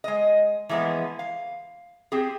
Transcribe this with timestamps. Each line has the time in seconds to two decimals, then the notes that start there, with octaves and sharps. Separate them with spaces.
0.04 G#3 D#5
0.69 E3 F3 G#3 A#3 B3
1.19 F5
2.12 C4 G4 G#4